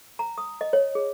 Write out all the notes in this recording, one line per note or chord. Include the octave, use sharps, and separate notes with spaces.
A#5
D#6
D#5
C#5
G#4